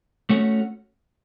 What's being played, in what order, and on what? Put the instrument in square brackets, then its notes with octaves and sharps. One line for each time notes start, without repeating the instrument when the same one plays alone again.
[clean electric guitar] A3 C#4 F#4 C#5